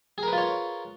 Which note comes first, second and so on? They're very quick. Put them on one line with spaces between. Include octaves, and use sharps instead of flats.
G#4 A#4 B4 F4 C#5